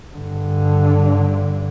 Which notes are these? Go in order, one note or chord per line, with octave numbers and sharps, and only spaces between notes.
G2 D3